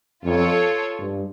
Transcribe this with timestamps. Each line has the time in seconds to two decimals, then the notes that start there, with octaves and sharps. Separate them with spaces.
0.24 F2 F4 A4 C#5
0.99 G2